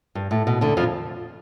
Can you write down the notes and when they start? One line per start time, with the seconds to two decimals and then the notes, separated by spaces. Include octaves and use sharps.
0.15 G2
0.31 A2
0.47 B2
0.61 D2 D3
0.77 F2 F3